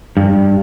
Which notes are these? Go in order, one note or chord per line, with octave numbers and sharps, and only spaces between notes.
G2